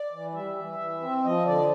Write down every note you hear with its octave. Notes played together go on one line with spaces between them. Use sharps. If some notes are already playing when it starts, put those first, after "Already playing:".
Already playing: D5
E3
G3 E5
E3
E3
C4
F3 D#5
D3 D5